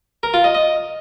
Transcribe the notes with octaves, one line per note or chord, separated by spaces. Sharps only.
A#4
F4
D#5
D#5